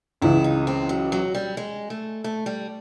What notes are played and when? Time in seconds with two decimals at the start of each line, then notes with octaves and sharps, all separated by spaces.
0.22 C#2 C#3 E3 E4
0.44 D#4
0.67 C4
0.89 F#3
1.12 F#3
1.35 G3
1.57 G#3
1.90 A3
2.24 A3
2.46 G3